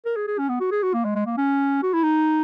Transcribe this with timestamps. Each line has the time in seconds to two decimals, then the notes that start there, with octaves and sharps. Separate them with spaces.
0.06 A#4
0.17 G#4
0.28 G#4
0.38 C#4
0.49 B3
0.60 F#4
0.72 G#4
0.83 F#4
0.94 A#3
1.05 G#3
1.16 G#3
1.26 A#3
1.38 C#4
1.83 F#4
1.94 E4
2.03 D#4